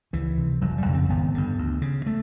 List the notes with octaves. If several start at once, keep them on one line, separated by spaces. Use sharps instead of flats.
C#2 E3
C3
F1 F#3
G3
F2 C#3
C4
G#1 B3
G2 D3
D2
C#3
A3